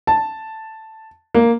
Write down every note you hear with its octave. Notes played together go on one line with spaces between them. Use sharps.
A5
A#3